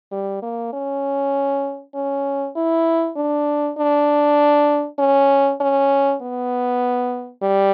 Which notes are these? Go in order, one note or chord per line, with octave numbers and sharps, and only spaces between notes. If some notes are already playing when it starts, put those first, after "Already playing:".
G3
A#3
C#4
C#4
E4
D4
D4
C#4
C#4
B3
G3